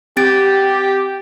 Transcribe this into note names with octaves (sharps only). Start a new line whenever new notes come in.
C4 G4 A6 D7